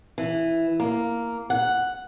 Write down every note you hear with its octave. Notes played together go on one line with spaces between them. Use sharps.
E3
A#3
F#5